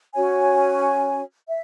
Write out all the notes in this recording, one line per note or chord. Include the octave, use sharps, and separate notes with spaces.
C#4 F#4 C#5 G#5
E5